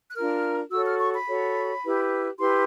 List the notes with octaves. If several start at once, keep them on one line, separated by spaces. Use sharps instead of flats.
F#6
D4 F4 A#4 F6
F#4 A4 C#5 E6
F6
C#6
B5
F#4 A4 C#5
E4 G4 B4
E4 G4 B4 C6